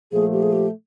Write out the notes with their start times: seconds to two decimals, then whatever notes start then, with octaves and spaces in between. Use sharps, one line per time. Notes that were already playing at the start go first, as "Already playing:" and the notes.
0.12 A#2 F3 A3 G#4
0.32 G4
0.43 G#4
0.53 G4